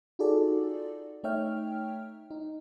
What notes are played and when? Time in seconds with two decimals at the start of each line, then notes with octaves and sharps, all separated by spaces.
0.19 D#4 F4 F#4 G#4 A4 D5
1.24 A3 D#4 C#5 E5 G5 F6
2.31 D#4